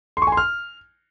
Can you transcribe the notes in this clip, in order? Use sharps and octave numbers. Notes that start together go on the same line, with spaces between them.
C6
C#6
G#5
C6
F6